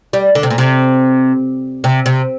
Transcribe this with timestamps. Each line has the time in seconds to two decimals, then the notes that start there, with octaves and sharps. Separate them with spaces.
0.13 G3
0.35 D3
0.43 C3
0.50 A#2
0.58 C3
1.84 C3
2.06 C3